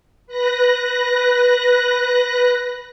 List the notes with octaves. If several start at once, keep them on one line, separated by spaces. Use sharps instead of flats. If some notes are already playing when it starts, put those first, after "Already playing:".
B4 F#6 A#6